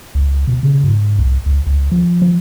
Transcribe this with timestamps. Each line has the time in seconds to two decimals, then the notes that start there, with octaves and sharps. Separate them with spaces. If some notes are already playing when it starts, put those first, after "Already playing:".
0.15 C#2
0.48 B2
0.63 C#3
0.84 G#2
1.19 C2
1.46 C#2
1.67 C#2
1.92 F3
2.22 F3